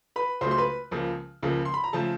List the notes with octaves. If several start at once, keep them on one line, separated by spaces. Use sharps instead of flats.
B4 B5
C#2 C#3 F#3 A3 C5 C6
C6
B4 B5
C#2 C#3 F3 A#3
C#2 C#3 F3 A#3
C6
B5
A#5
C#3 F3 A3 A4 A5